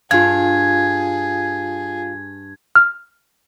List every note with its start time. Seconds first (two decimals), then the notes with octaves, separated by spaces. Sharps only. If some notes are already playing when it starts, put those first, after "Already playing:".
0.11 G2 F4 G#4 F5 G#6
2.76 F6